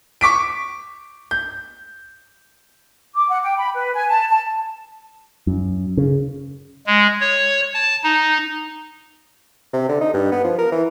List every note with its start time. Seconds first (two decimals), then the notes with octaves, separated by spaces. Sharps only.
0.21 C#6 D6 B6 D7
1.31 G6
3.15 D6
3.30 F#5
3.43 G5
3.58 B5
3.74 B4
3.95 G#5
4.09 A5
4.30 A5
5.47 F#2
5.97 C#3
6.87 G#3
7.21 C#5
7.74 A5
8.03 D#4
9.73 C3
9.89 D3
10.01 D#4
10.14 G2
10.32 B3
10.44 F3
10.59 A#4
10.72 E3